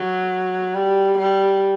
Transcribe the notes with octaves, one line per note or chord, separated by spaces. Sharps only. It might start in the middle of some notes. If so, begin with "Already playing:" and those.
Already playing: F#3
G3
G3